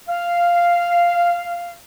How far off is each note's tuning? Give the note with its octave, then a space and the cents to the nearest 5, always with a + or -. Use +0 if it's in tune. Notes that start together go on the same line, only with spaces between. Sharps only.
F5 -5